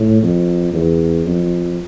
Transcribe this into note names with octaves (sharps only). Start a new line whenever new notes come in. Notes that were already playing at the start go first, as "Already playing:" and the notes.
Already playing: A2
F2
E2
F2